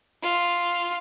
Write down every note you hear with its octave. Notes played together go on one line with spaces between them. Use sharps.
F4